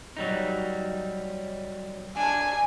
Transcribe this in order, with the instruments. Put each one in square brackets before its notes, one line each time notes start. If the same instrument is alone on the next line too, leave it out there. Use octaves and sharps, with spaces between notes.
[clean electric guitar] F#3 G3 D#4
[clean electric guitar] D4 [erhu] G#5